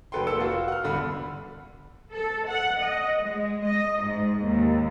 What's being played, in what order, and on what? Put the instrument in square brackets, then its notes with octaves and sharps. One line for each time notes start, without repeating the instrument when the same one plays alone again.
[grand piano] F1 F#4 A4 B4 G5 C6
F1 A#3 A4 E6 C#7
F4 F#4
F#5 F6
E2 G2 D3 B5
[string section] A4
F#5
D#5
G#3
D#5
G#2
D#2